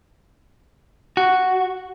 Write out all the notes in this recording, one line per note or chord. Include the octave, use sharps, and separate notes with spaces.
F#4